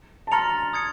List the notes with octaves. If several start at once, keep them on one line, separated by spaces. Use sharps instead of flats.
A5
A#5 C6 F6 A6 C#7 F7
D#6 G#6 C#7